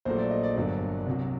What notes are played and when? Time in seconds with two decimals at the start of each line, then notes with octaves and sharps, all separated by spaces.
0.05 A#1 A#2 F#3 A3 C5
0.18 D5
0.31 D#5
0.44 D5
0.56 G1 G2 F#3 A#3 D5
1.06 C2 C3 F#3